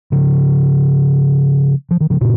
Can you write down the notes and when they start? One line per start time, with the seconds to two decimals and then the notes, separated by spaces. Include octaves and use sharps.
0.12 C#3 F3
1.91 F3
2.01 D#3
2.10 C#3 F3
2.21 A#2 C#3